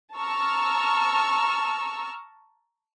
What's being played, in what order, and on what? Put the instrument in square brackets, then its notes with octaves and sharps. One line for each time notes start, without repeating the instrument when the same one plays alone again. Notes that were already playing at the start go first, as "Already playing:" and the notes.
[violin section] A5 A#5 C#6 E6 F6